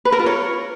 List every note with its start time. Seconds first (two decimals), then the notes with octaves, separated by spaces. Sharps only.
0.05 B4
0.12 A#4
0.19 F4
0.26 C#5